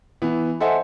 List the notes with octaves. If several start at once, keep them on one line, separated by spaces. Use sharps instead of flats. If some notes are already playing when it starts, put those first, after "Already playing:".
E3 B3
A4 C5 D#5 E5 F#5 G#5